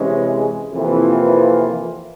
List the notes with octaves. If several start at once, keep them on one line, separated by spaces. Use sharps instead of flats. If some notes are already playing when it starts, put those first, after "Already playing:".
Already playing: C3 E3 G#3 C#4
F2 C3 E3 A#3 F4